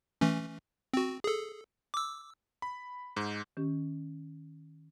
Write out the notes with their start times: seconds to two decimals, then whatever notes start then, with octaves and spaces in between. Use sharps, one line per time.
0.21 E3 A3 C#4
0.94 C4 F#4
1.24 G#4 A4
1.94 D6 E6
2.62 B5
3.17 G#2
3.57 D#3 C#4 G4